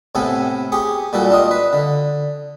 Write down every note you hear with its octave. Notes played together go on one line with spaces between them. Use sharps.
A2 C3 B3 A4 G#5
G4 G#4 C#6
A#2 G3 F#4 A4
D4 F4 D#5
B4
D3